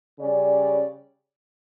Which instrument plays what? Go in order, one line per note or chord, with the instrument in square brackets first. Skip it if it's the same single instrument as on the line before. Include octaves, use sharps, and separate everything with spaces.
[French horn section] C#3 G3 C#4 D5